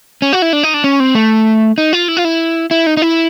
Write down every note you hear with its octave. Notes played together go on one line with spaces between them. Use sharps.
C#4
F#4
E4
D4
D#4
D4
C#4
C4
A3
D#4
F4
E4
F4
E4
E4
D#4
D#4
E4